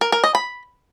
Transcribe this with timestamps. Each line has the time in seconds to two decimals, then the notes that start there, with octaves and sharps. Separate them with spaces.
0.01 A#4
0.12 A#4
0.24 D#5
0.35 B5